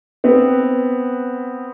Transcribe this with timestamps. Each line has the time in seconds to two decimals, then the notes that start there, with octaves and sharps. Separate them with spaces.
0.24 B3 C4 B4